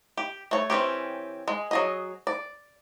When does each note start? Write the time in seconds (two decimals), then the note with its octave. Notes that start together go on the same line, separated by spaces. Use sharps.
0.17 G4
0.51 A3 C#5
0.70 E3 C4 C#4 G4
1.48 G#3
1.71 F#3 G#4 D#5
2.27 D5